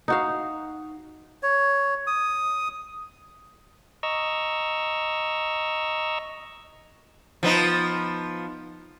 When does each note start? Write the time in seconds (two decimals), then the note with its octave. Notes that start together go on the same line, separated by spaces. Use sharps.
0.08 D#4 F#4 F5
1.43 C#5
2.07 D#6
4.03 D#5 A#5 C#6 E6
7.43 F3 B3 D#4